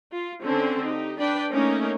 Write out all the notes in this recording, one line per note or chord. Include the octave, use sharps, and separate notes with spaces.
F4
D3 C4 C#4 A4
D#4 G4
D4 B4 D5 G5
A3 A#3 C#4 D#4 A#4